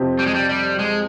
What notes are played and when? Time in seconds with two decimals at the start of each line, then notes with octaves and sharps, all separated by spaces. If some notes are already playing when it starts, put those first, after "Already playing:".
Already playing: F2 C3 F3 C4 G4
0.19 G3
0.26 G#3
0.34 G3
0.49 G3
0.79 G#3